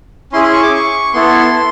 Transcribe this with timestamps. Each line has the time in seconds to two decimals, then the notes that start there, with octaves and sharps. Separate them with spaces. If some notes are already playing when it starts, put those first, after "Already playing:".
0.32 C#4 E4 G#4 C6
0.44 C6
0.53 C#6
0.63 D6
0.74 C#6
1.13 B3 E4 A4 C6